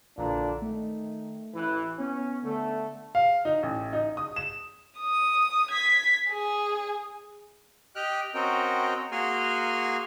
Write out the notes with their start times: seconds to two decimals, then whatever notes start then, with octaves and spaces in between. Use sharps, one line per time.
0.18 A#1 A#2 D3 E3 D4 A#5
0.62 D#3 A3
1.55 A1 E3 E4 F#6
1.99 B3 C#4
2.44 D3 A3
3.15 F5
3.45 D#4
3.63 A1
3.93 D#4
4.17 D#6
4.36 E7
5.00 D#6
5.71 G#6 B6
6.29 G#4
7.96 G4 D#5 G5 F6 F#6
8.35 C4 C#4 F#4 A#4 D#5 G5
9.12 A#3 F#4 G#4 G#5 C6 F6